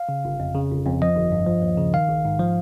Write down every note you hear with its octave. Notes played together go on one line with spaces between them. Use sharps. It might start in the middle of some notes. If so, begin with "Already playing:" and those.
Already playing: F5
C#3
G1
F2
C#3
G1
F2
F3 D#5
G1
G2
F3
D#2
C#3
D#3 F5
A#1
G#2
F3